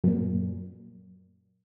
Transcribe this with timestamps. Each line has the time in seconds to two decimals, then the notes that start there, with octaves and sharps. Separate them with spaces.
0.04 F#2 A#2